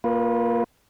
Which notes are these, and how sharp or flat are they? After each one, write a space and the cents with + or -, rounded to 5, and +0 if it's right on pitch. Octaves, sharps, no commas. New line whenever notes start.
A#3 +0 F4 +0 B4 -25